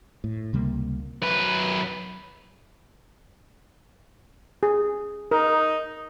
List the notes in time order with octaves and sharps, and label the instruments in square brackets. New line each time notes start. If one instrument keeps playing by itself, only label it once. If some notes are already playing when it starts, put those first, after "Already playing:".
[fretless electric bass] A2
C#2 C3 G3 A#3
[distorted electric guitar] F#2 B4
[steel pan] G#4
[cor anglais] D#4 [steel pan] A#4